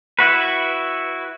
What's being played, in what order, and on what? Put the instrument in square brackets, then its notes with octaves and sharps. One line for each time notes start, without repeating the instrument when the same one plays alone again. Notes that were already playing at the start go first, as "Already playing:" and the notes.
[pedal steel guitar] E4 F#4 B4